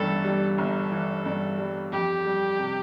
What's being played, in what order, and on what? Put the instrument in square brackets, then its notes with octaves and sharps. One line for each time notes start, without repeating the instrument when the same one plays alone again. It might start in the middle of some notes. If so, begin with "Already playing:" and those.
Already playing: [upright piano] G1 G2 E3 [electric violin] A4
[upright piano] G3
[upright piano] G1 [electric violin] A4
[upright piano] E3
G2
G3
[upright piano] F2 [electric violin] G4
[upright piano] G3
C3